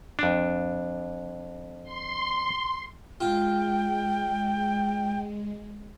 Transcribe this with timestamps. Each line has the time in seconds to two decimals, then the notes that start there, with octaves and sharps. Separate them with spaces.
0.19 F2 D4
1.83 C6
3.21 G#3 F4 G5